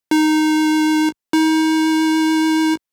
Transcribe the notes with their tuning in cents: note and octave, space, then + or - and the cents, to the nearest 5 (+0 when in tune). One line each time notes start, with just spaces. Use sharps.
D#4 -5
D#4 +30